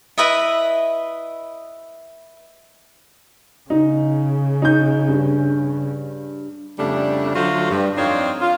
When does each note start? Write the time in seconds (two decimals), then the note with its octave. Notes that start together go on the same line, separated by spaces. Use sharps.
0.18 E4 B4 D#5 E5
3.70 C#3 D#4
4.62 D#4 G6
5.08 G2
6.79 F2 C#3 G3 A3 D4
7.35 D3 F#3 A3 F4 F#4 C5
7.70 G2
7.97 F2 C4 D4 D#4 F4 C#5
8.42 F4